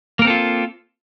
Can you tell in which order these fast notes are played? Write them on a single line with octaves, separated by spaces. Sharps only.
A#3 A#4 C4 A4 F4